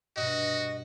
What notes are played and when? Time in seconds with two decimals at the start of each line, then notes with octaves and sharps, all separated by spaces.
0.16 G2 B2 F#4 D#5